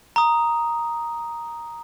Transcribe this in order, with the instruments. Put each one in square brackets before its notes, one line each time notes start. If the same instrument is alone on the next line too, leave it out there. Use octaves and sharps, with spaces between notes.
[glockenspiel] A#5 D#6